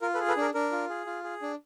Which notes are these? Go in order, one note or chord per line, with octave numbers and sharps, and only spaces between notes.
F4 A#4
A4 B4
G#4
A4 B4
D4 A#4
D4 A#4
F4
G#4
F4
G#4
D4